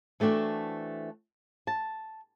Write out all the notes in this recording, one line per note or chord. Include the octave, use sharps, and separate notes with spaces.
E3 A3 C4 D4 F#4
A5